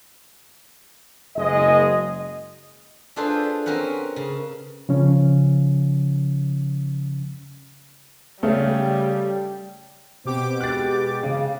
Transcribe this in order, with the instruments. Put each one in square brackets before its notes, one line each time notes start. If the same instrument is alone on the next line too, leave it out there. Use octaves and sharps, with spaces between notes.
[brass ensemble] F#1 G#3 D#5
[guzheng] D4 F4 G#4 A4 B4 C5
C4 C#4 A#4 B4 F#5
C#3
[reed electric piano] C#3 F3 C#4
[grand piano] C#3 A3 [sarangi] G3
[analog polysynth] B2 G4 D6 [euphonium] C4
[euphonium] G#3 [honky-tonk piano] F#6 A6
[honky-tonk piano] C#3